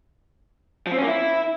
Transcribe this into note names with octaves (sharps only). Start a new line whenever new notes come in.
F3
C4
C#4
A#3
E4